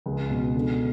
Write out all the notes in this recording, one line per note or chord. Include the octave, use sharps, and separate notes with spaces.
C#2
B2
D3